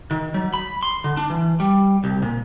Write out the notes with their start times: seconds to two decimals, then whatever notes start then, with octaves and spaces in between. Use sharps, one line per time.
0.11 D#3
0.34 F#3
0.54 B5
0.83 C6
1.04 D3
1.17 D4
1.30 E3
1.60 G3
2.04 C2
2.22 A#2